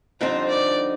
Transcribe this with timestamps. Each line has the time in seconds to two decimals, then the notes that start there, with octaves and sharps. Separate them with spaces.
0.21 F2 D3 G3 C4 D#4 C5
0.49 D5